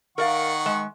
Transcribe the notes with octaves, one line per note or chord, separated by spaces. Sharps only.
D#3 A#4 D5 F5 F#5 C#6
G#3